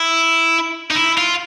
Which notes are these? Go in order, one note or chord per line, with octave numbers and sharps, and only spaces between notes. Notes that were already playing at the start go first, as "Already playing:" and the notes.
Already playing: E4
D#4
E4
F4